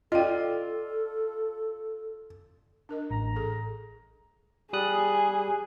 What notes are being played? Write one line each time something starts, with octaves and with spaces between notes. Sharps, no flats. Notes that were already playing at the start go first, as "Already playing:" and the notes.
F4 A4 D5 D#5 G5
D4 A#4 D#5
A1 A#5
G#4 A4
G3 G#4 D#6 F#6